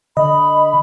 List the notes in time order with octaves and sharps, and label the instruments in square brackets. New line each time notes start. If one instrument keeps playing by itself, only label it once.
[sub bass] D3 [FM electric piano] D#5 [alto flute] B5